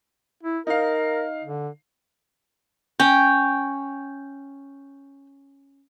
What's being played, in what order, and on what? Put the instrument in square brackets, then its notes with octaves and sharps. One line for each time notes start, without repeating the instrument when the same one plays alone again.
[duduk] E4
[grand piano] D#4 F5 [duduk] A#4
[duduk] D3
[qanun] C#4 [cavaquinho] G5